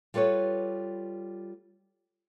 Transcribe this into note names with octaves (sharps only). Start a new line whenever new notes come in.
G3 F4 A4 B4 C#5